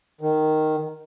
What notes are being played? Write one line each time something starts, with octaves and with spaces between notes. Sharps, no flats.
D#3